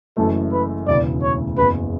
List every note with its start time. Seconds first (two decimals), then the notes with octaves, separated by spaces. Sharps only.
0.17 F#1 F#2 E3 A3 A4
0.52 B4
0.87 E1 D2 C#3 E3 B3 D5
1.22 C#5
1.57 F#1 E2 C#3 B4